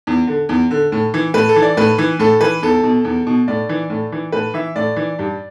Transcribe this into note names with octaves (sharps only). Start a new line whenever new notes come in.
E2
D3
E2
D3
A2
E3
A2 B4
A4
E3
D5
A2 B4
E3
A2 A4
E3 B4
E2 A4
B2
E2
B2
A2 D5
E3
A2
E3
A2 B4
E3 E5
A2 D5
E3
G2